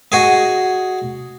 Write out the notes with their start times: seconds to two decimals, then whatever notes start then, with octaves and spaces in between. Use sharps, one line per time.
0.12 F#4 G#4 D#5